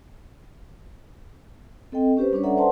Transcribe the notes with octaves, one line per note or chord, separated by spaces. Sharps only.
C4 A4 D#5 G5
C#4 G4 B4 C5
G3 C#4 D4 B4 C#5
A4 D5 E5 F#5 A#5
B4 C5 D5 F#5 A5 C6